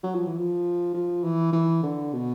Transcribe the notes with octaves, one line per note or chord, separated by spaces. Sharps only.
F#3
F3
E3
F3
F3
E3
E3
D3
B2